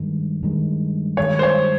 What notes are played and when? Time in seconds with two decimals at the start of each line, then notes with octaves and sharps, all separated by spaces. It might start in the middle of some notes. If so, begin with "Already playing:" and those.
Already playing: G2 D#3 G#3
0.43 G2 D#3 G#3
1.17 G2 D#3 G#3 C#5
1.39 C5
1.43 C#5